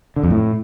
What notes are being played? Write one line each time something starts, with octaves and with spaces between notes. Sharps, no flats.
D3
F2
A2